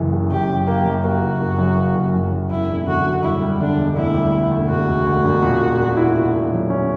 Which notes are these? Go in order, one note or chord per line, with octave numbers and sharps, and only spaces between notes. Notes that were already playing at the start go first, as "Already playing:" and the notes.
Already playing: F#1 F#2 E3
F#1
F#2 G4
F#2
A#3 G4
F#2
A#3 F#4
F#1
F#1
F#2
A#3
F#1
F#2
F#2
E1 E4
E1
D3 F#4
E1
G3 E4
G3
D3 D4
E1
D2 E4
G3
E1
D2
E1 F#4
E1
D2
E1
A#2
A#2
A#2
E4
A#2
A#2
F#3
C#4